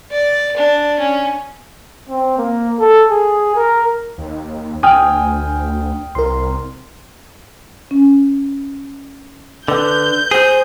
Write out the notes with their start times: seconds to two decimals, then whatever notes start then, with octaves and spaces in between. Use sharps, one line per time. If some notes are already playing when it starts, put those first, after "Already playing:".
0.12 D5
0.57 D4
0.99 C#4
2.09 C4
2.38 A#3
2.80 A4
3.11 G#4
3.56 A#4
4.18 D#2
4.83 D2 G5 G#5 D#6 F6
6.15 C2 A#4 C6
7.91 C#4
9.68 D3 B4 G6
10.31 G#4 C5